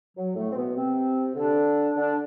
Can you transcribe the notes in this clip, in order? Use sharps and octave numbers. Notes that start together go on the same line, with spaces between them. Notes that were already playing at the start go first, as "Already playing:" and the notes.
F#3
A2 A3
C4
B2 B3
C3 C4
D3 D4
D3 D4